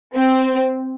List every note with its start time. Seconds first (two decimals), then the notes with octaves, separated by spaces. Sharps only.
0.15 C4